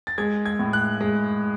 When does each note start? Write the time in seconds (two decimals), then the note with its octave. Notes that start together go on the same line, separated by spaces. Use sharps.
0.07 A6
0.18 G#3 G#6
0.46 G#6
0.59 A2
0.73 F#6
1.01 G#3